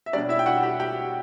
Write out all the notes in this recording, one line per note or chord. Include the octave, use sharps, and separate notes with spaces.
E5
B2 G3 C#4 D4 D5
E4 E5
G5
F#4 F#5
G4 G5
G4 G5